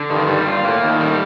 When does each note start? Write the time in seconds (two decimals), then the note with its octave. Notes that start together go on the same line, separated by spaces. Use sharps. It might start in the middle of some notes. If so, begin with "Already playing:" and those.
Already playing: D3
0.10 G2 D#3
0.28 G3
0.46 F4
0.64 A2 A#3
0.83 D#3
1.00 G3